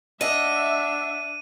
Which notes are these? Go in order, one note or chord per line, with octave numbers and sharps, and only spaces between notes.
D4 D#5 E5 F#5 D#7